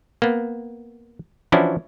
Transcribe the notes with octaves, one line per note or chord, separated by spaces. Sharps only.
A#3 B3
E3 F3 C#4 D4 E4 F#4